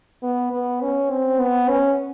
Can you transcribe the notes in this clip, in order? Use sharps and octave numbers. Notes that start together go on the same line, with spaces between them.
B3
B3
C#4
C4
B3
C#4